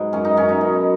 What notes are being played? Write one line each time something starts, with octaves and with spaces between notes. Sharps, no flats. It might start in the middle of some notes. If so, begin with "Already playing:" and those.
Already playing: G#2 F#3 G#4 B4
F#2 C#4
D#4
F#2 C#4
D#4
B2